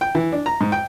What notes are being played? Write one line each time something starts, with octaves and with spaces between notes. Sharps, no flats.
G5
E3
D4
A#5
G#2
G5